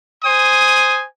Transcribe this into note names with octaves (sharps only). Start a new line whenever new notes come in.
C5 G#5 D#6